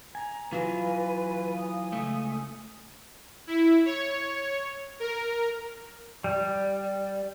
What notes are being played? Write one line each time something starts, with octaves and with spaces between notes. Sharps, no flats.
G#5 A#5
E3 F#3 F4 B4 G#5
G#5 D#6
C#2 A3
E4
C#5
A#4
G3